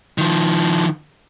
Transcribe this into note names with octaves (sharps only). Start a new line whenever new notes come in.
D#3 F3